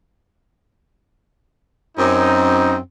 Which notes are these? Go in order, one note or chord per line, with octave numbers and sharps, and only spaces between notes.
F#2 C4 D#4